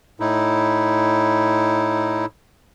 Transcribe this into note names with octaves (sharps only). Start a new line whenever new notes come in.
A2 D#4 E4